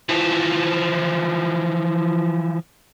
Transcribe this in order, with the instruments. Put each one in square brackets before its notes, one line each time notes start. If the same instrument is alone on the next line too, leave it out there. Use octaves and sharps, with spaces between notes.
[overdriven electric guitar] E3 F3